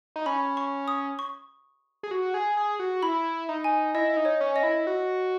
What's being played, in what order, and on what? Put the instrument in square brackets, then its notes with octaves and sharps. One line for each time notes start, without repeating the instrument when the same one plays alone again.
[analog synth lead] D#4
[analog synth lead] C#4 [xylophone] B5
[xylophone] C#6
D#6
C#6
[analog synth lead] G#4
F#4
G#4
G#4
F#4
[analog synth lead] E4 [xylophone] B5
[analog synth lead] D#4
[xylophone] G#5
[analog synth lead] E4 [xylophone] D#5
[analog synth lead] D#4
[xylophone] C#5
[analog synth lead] C#4
[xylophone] D#5
[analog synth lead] E4
F#4